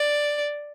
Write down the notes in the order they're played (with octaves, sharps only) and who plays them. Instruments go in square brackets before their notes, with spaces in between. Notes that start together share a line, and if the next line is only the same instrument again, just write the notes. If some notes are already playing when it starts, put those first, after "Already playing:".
Already playing: [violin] D5